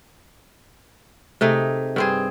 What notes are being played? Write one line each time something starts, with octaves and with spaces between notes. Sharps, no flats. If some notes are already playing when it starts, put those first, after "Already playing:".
C3 A3 D#4 G#4
G2 C4 G#4